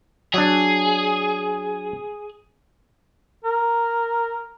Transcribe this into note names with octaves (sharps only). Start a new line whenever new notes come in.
F#3 D4 G#4
A#4